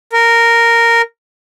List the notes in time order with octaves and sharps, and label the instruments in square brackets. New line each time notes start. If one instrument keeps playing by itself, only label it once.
[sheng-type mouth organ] A#4